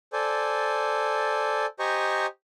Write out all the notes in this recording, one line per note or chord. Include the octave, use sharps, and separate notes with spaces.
A4 C5 D5 G#5
G4 C5 D#5 G#5 A#5 C#6